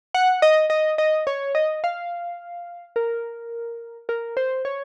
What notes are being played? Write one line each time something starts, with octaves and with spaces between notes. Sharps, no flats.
F#5
D#5
D#5
D#5
C#5
D#5
F5
A#4
A#4
C5
C#5